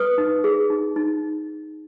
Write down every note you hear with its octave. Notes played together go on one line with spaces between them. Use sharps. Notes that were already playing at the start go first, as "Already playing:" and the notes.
Already playing: B4 D#6
D#4
G#4
D#4
D#4